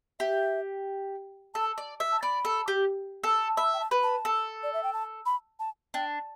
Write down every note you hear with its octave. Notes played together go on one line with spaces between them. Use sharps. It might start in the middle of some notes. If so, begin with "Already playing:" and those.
G4 E5
A4 A5
D5
E5
A5
D5 B5
A4
G4
A4
E5 B5
G5
A5
B4
A5
A4
D5
E5
G5
A5
B5
A5
D4 G5